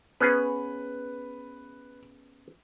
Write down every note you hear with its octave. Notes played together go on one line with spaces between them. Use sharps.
B3 C#4 G#4 B4